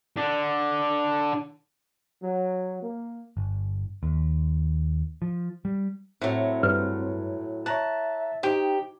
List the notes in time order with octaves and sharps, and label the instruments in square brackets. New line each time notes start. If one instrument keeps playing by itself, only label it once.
[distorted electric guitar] D3 D4
[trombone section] F#3
A#3
[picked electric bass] G1
D#2
F3
G3
[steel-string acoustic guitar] A2 F#3 [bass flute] C4
[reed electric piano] G2 [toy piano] B4
[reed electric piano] C#5 A#5 F#6 [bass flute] E5 [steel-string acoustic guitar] A5
[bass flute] D#4 [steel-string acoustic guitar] G4 [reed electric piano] C5 G5